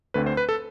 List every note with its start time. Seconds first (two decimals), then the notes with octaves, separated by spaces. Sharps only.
0.14 D2 D3 A3 C4 B4
0.26 C5
0.37 B4
0.49 A4